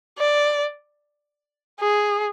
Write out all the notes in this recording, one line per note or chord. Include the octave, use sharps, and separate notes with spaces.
D5
G#4